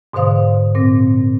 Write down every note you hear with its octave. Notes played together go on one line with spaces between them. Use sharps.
G#2 B2 D3 C5 F5 D#6
A#2 C4 A#6